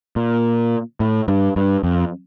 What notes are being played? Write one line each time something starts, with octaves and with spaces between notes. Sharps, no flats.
A#2
A2
G2
G2
F2